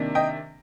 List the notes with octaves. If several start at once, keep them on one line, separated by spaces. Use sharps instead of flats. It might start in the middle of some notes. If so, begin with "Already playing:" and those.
Already playing: C3 D#3 A#3 D4
D#5 G5